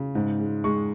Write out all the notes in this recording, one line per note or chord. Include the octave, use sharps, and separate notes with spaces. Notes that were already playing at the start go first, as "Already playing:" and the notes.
Already playing: C#3
G#2
G#3
G#3 C#6